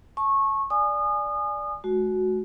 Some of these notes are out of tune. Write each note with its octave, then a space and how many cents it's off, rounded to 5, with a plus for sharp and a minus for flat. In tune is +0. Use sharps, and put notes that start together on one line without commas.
A5 -20 C#6 -20
D5 +0 G#5 +0 D#6 -30
G#3 +45 F#4 +0